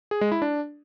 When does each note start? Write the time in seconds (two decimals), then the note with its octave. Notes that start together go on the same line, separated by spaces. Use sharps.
0.11 G#4
0.21 G#3
0.32 E4
0.42 D4